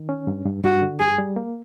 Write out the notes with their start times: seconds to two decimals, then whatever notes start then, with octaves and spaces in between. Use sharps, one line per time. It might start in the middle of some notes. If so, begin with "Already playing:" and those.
Already playing: D#3
0.09 C#4
0.27 G2
0.45 G2
0.64 G2 F#4
0.82 D3
0.99 G2 G#4
1.18 G3
1.36 A#3